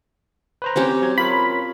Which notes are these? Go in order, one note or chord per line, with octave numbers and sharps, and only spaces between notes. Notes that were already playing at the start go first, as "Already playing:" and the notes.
B4 C5 A#5
C4 C#4 G4
F#3 G#6
F4 A#4 C#5 B5